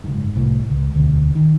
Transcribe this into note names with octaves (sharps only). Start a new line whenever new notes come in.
F#1 G#2
C2 A2
C#2
E1 D2
D#3